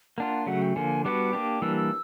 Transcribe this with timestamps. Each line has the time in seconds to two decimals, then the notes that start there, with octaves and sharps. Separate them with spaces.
0.18 A#3 D4 F4 F#5
0.46 C#3 F#3 A3 F#5
0.62 G5
0.76 D3 F3 A#3 G#5
1.04 G3 B3 D4 F#4 B4 D6
1.33 A#3 D4 G4
1.62 E3 G3 A#3 D4 E6
1.77 E6